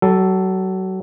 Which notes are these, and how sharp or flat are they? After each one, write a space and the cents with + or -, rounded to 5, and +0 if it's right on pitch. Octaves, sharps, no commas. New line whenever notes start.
F#3 +30 A4 +0